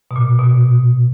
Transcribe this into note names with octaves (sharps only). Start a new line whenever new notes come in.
B2
A#2
B2
A#2